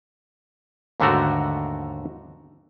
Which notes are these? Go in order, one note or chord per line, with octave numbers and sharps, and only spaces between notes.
D#2 G#2 D3 A3 F#4 A#4